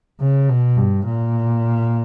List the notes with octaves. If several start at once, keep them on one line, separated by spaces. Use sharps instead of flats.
C#3
B2
G2
A#2